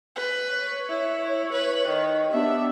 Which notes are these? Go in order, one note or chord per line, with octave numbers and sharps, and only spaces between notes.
B4
C#5
E4
B4
D#3
B3 D4 G4 E5